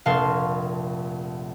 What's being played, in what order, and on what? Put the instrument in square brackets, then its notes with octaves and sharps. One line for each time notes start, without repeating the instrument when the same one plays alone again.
[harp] F1 A#1 F5 A5 C6 C#6